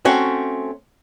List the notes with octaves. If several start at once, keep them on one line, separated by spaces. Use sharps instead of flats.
A3 C4 C#4 F#4